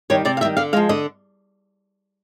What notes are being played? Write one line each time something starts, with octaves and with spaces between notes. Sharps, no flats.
D#3 G3 C#5
C3 D5
F5
D#3 G3 E5
D3 F5
F3 G#3 F5
D3 D#5